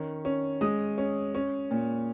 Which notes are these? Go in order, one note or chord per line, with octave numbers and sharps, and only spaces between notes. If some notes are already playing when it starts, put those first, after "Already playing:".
Already playing: D#3 C#4
C#4
G#3 D#6
C#4
C#4
A#2